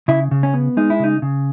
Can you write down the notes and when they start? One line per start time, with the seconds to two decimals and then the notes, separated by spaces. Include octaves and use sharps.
0.08 C#3 E4
0.31 C#3
0.43 C#4
0.54 B3
0.77 G#3 D#4
0.90 E4
0.99 C#3 D#4
1.22 C#3